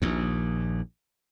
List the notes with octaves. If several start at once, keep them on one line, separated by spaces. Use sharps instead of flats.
A#1 D#2